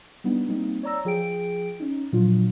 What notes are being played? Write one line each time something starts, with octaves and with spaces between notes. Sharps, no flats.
G3 B3 D4 D#4
G3 A#3 C4 D#4
C#5 D5 A#5 E6 A#6
F3 G#4 G5 D7
C#4 D#4
A#2 F3 F#3 D4 F4